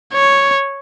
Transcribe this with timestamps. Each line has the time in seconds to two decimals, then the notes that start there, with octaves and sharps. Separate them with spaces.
0.14 C#5